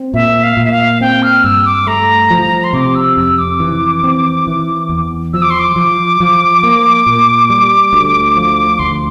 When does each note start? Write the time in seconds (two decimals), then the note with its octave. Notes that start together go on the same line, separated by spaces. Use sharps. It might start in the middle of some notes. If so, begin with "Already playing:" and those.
Already playing: C4
0.14 A#2 E5
0.43 F5
0.57 A#2
0.65 E5
0.72 F5
1.01 C4 G5
1.23 F6
1.44 G2 E6
1.65 D6
1.87 A3 A#5
2.30 F3
2.64 C6
2.73 C3 D6
2.95 E6
3.17 F2 E6
3.38 D6
3.60 E3
4.04 C4
4.47 E3
4.89 E2
5.33 F3 E6
5.42 D6
5.50 C6
5.59 D6
5.76 F3
6.20 F3
6.63 A#3
7.06 A#2
7.50 G3
7.93 D2
8.37 F3
8.79 D2 C6